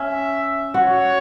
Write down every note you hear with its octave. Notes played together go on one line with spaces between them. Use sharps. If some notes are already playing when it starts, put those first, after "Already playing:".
Already playing: C#4 E5
F#4 C#5